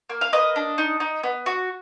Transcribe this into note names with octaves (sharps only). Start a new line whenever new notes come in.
A#3
F5
A#3 B4 D#5
D4
D#4
D#4
B3
F#4